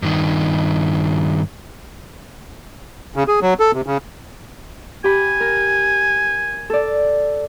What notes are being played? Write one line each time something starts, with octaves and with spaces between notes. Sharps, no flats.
G2 D#3
C#3
G#4
F#3
A4
C3
C#3
G4 G#5 B5
A#4
A4 D5